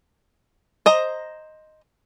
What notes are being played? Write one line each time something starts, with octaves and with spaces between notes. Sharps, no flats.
C5 D#5 A#5